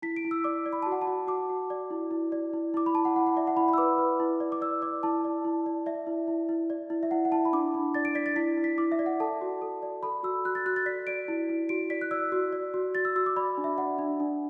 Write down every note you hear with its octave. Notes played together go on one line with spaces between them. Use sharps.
E4 B6
D7
E4
E6
D5 D6
D5
B5
F#4 A5
F#5
A5
F#4
F#4 D6
F#4
D5
E4
E4
D5
E4
E4 D6
B5
E4 A5
F#5
E4 F#5
F#5
D5 E5
F#5
E4 B5
B5
E6
B4 D6
B4
E4
D5
D6
D5 E6
D5 D6
E4 A5
D5
E4
D5
D5 E5
E4
E4
E4
D5
E4
E5
E4 F#5
F#5
E4 A5
B5
D4 D6
D4
D5 A6
D7
D5 B6
A6
E4 B6
E4
B6
E4 D6
E5
D5
F#5
A4 A5
F#4
A4
D5
A4 B5
F#4 E6
F#4 F#6
A6
F#4 F#6
A6
D5 B6
D5 D7
E4
E4
F#4 D7
D5 B6
F#6
D5 E6
F#4
D5
F#4
F#4 A6
E6
F#4 E6
D6
D5 B5
D4
E5
D5 F#5
D4
D4